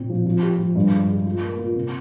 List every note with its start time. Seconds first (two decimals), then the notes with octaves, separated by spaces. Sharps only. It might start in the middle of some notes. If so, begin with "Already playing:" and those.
Already playing: A#2 C4
0.09 F3
0.26 F3
0.43 G4
0.59 F3
0.75 G2
0.93 G#3
1.09 G#3
1.26 F4
1.42 A#3
1.59 F4
1.75 C3